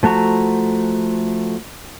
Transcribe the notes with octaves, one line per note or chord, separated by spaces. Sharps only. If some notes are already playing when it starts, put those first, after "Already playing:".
F3 A3 F#4 A#5 C#6